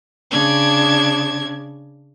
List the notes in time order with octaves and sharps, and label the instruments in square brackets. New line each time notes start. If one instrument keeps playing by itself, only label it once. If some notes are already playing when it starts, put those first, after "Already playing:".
[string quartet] C#3 D4 G#6